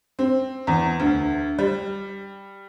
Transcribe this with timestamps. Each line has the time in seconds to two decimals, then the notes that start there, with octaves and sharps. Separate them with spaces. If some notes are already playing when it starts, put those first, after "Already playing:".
0.19 C4
0.67 E2
1.00 D2
1.59 G3